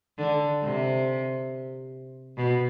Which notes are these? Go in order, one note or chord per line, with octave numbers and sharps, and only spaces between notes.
D3
C3
B2